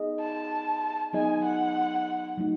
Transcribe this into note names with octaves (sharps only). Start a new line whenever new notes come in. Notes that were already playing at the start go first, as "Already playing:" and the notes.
Already playing: B3 D#4 G#4 D#5
A5
F#3 B3 D#4 G#4 D#5 G#5
F#5
F#3 A3 D#4